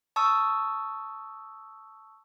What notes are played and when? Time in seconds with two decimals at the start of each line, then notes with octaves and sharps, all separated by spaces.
0.16 A5 C#6 D#6 E6